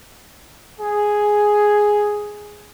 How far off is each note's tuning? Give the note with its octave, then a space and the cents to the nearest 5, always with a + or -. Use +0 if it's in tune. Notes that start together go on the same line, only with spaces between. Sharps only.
G#4 +0